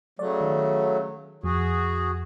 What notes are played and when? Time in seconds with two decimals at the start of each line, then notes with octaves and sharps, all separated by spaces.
0.19 C#3 F#3 A3 D5
0.41 D#3
1.44 F2 F#4 G#4